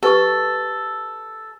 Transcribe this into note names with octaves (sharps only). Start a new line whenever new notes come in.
G4 A4 B4 C#6